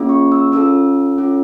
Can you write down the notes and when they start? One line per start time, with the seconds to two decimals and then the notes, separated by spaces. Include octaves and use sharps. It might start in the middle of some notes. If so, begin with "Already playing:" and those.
Already playing: A#3 C#4 F4 G#4
0.09 C#6
0.32 E6
0.52 C#4 F4 A4 E6
1.18 C#4 F4 A4